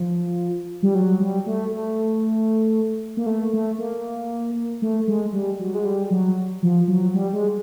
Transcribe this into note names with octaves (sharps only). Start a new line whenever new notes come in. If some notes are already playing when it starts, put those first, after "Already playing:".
Already playing: F3
G3
F#3
G3
A3
A3
A#3
A3
A3
A#3
A3
G#3
G3
F#3
G#3
G3
F#3
F3
F#3
G3
G#3